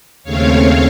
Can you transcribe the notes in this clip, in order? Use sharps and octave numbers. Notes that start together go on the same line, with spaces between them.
D#2 C#3 A3 C4 C#5 F5